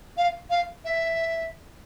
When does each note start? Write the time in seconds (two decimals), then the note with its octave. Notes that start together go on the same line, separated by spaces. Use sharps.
0.17 F5
0.50 F5
0.85 E5